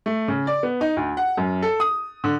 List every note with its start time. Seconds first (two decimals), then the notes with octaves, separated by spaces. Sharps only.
0.06 A3
0.28 C#3
0.47 D5
0.63 B3
0.81 D#4
0.97 D2
1.17 F#5
1.37 F#2
1.62 A4
1.80 D#6
2.24 D3